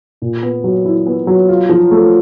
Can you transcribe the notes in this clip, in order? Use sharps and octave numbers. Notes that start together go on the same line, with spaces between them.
A#2
B3
F#3
E4
B3
F#3
F4
F3
A3